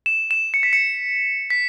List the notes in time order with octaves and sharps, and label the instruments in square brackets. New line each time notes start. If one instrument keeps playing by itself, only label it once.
[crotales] E7
E7
C#7
B6
C#7
B6